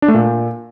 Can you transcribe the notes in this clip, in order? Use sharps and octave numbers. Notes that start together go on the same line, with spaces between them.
D4
A3
A#2